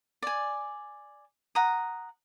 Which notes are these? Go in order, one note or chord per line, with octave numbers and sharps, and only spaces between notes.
D5 G#5
F#5 A#5 D#6